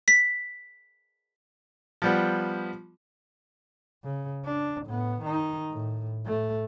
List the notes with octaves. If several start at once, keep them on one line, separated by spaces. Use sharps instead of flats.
B6
F3 G3 B3
C#3
D4
A2 B3
D#3 D#4
A2
A2 A3